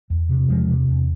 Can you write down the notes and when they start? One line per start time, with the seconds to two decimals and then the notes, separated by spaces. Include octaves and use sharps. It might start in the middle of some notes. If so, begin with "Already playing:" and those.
0.10 E2
0.29 C3
0.48 E2 F3 G#3
0.68 C3
0.88 E2